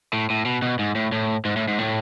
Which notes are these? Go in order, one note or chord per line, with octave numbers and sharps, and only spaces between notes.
A2
A2
B2
B2
G#2
A2
A2
G#2
A2
G#2
A2